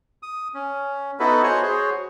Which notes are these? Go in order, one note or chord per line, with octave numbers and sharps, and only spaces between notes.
D#6
C#4
B3 D#4 E4 F#4 A4 B4
F#4 C5 C#5 F#5 G#5
F#4 G#4 C5 C#5